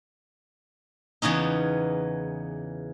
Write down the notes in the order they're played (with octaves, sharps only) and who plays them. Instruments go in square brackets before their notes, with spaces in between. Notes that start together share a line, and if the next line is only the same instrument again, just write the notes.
[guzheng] E2 C#3 B3 C#4 D#4